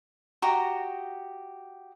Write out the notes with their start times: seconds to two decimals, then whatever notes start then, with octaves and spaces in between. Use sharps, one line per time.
0.42 F#4 G4 D#5 A#5